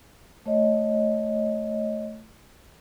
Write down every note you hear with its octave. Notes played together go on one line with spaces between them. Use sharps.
A3 C#5 D#5